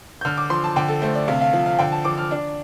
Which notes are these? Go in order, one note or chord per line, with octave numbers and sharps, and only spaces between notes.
G6
D3 F6
D6
F3 C6
A5
D3 G5
A4
A3 C5
D5
C3 F5
F5
F3
F5
D3 G5
A5
F3 D6
F6
D4